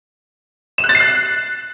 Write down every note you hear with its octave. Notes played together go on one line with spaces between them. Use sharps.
E7
F#6
A6
C7
F#6